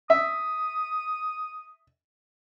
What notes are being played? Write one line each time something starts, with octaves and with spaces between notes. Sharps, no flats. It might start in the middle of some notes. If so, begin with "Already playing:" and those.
E5 D#6